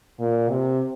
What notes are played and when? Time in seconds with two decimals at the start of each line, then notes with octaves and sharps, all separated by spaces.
0.20 A#2
0.48 C3